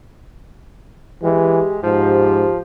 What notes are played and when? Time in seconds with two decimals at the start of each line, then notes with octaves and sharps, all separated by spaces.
1.23 E3 G#3 G4
1.83 G#2 F3